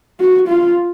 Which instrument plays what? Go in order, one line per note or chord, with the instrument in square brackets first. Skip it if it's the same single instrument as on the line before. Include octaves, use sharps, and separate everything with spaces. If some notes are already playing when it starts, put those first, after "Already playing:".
[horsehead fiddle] F#4
F4